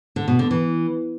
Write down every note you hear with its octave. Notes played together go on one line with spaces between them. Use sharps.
D3
B2
D3
E3